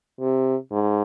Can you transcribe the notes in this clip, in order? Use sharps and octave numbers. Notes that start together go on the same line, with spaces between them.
C3
G#2